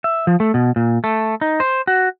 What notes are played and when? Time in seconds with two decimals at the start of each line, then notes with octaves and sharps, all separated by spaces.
0.04 E5
0.27 F3
0.40 A3
0.54 B2
0.76 A#2
1.04 A3
1.41 D#4
1.60 C5
1.87 F#4